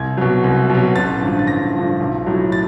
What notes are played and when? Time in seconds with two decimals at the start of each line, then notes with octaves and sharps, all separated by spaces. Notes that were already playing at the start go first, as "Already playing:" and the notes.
Already playing: C2 G#6
0.17 B2 F#3
0.44 C2
0.70 B2 F#3
0.96 A1 A6
1.21 G2 D3 F3
1.39 A6
1.47 A1 A#6
1.74 G2 D3 F3
2.00 B1
2.26 A2 F#3
2.52 A6